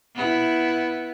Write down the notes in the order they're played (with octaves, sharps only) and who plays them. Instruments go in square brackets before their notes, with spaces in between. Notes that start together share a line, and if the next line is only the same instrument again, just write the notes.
[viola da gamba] B3 E4